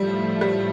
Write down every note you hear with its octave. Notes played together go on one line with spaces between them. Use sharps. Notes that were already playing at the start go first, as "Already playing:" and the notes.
Already playing: A2 F3 G3 A3
G3